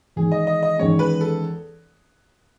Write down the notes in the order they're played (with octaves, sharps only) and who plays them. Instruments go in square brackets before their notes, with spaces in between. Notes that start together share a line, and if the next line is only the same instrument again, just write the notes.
[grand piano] E2 D#3 G#3 [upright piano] G#4
[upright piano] D#5
D#5
D#5
[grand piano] E2 D#3 G#3 C#4 [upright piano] C#5
[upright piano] B4
A4